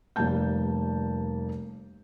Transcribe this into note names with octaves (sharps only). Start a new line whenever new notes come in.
F1 G3 A#3 A5 G6